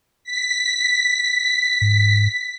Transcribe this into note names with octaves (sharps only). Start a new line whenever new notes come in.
B6
G#2